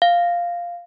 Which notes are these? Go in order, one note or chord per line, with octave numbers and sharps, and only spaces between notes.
F5